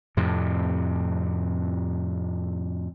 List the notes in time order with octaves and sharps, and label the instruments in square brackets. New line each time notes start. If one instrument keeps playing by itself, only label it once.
[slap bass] F2 A2 C3